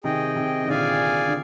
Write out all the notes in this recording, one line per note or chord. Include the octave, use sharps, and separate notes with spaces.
C3 D#3 G#4 D#5 G5
C3 D#3
D#3
A#2 D3 G#4 D5 F5 G#5
D3